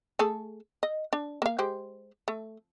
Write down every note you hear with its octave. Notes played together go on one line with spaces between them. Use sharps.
A3 G#4 A4
D#5
D4
A#3 F5
G#3 G4 C5
A3